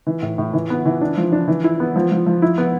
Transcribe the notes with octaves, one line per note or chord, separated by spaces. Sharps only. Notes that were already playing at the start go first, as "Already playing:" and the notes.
E3
A2
A2
E3
B3
E3
D4
F3
D4
E3
E4
B3
F3
F3
F3
E4
B3